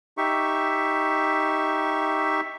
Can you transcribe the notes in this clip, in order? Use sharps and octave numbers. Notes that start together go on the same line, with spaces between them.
D#4 G4 E5 C#6